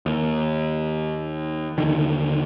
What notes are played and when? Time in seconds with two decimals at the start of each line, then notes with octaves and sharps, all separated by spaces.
0.06 D#2
1.78 D#2 D3 D#3